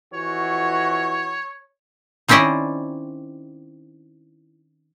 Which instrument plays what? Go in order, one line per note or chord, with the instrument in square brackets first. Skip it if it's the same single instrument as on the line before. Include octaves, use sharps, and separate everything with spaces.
[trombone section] F2 E3 F#4 [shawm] C#5
[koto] D#3 C4 C#4 E4 D5 D#5